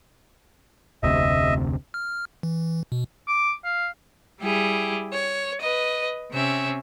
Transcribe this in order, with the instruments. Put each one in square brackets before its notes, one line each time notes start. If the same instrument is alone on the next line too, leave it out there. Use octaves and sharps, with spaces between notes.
[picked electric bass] F1 D2 C3 [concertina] D#5 E5
[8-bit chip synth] F6
E3
B2
[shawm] D6
F5
[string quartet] G3 E4 G4 G#4
C#5
B4 D#5
C3 C4 C#4 E5